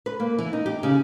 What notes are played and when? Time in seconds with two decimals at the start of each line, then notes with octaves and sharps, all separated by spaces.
0.06 B4
0.20 A#3
0.38 E3
0.53 D#4
0.66 G4
0.83 C#3